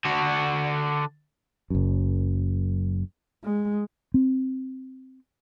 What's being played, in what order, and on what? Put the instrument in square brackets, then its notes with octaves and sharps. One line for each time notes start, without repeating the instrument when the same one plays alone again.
[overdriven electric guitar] D3 F#4
[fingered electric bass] F#1 F#2
[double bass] G#3
[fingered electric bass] C4